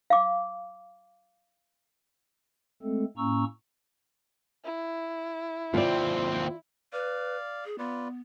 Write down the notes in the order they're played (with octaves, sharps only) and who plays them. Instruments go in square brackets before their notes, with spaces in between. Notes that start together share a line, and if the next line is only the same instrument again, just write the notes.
[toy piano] F5 D6
[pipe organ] G#3 A3 C4 A4
A2 A#3 C#4 A#5 C#6 E6
[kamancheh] E4
[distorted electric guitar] D#2 C4 [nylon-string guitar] F4 D5
[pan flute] B4 [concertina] D5 F5
[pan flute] G#4
[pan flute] B3 [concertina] F4 B4 D5